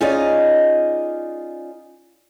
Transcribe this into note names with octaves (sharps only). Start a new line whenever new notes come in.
C#4 D#4 F4 G#4 D5 D#5